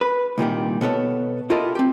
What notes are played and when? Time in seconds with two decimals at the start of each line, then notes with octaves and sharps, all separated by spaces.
0.01 B4
0.38 C2 A#2 D#3 G3
0.81 B2 B3 A4 C#5
1.50 E4 F4 G4 A4 A#4 D#5
1.75 C4 G4